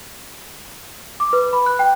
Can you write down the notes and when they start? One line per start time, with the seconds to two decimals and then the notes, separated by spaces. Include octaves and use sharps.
1.20 D6
1.33 B4
1.53 B5
1.66 F#6
1.79 G5